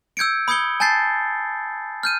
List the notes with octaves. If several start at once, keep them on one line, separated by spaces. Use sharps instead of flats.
E6 G6 G#6 C#7 D7
B5 D#6 G6 G#6 C#7 G7
G#5 A5 G6 A6 C7
F6 G6 D#7